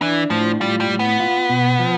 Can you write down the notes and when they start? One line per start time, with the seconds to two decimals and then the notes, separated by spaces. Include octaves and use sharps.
0.01 E3 D4
0.30 A2 F3
0.60 G3 F4
0.80 G3
0.90 A2
0.99 B3
1.20 F4
1.50 B2
1.79 F3